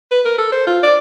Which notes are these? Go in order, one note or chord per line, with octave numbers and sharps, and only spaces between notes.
B4
A#4
A4
C5
F4
D5